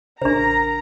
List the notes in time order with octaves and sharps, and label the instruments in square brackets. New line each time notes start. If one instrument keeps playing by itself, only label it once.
[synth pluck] A1 C#3 [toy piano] D4 C5 [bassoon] A#4 [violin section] A#5